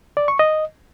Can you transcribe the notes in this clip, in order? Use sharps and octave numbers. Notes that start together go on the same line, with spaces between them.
D5
C#6
D#5